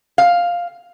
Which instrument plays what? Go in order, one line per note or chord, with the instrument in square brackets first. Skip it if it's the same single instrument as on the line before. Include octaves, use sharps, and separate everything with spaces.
[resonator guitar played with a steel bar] F5